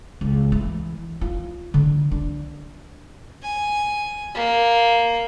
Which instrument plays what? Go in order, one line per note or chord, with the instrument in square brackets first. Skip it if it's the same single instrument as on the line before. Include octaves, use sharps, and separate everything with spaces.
[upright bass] C#2
E3
F4
D3
D4
[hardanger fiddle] G#5
A#3